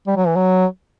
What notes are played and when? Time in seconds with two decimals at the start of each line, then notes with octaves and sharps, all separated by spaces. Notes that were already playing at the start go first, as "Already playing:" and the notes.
0.07 G3
0.17 F#3
0.27 E3
0.36 F#3